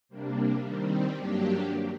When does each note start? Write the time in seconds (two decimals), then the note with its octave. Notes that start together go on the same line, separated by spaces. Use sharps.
0.09 C3 G3 A#3 D4
0.63 D#3 G3 C4
1.18 G2 F#3 A#3 D4 G4